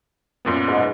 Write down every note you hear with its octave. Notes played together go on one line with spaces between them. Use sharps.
F#2 A#2 B3
G#2 B2